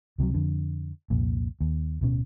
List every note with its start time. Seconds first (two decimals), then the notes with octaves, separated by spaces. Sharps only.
0.18 C#2 C3 E3 F#3
0.34 F2 D3
1.10 C2 F2 A#2
1.61 D#2
2.01 D1 B2 C#4